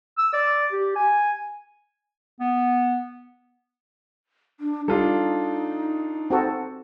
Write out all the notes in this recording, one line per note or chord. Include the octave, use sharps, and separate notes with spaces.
E6
D5
G4
G#5
B3
D4
G3 D4 D#4 F4 A4
C4 F#4 A4